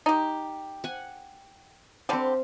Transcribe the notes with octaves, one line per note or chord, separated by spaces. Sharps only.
D#4 G4
F#5 G#5
D3 G3 C4 G4 F5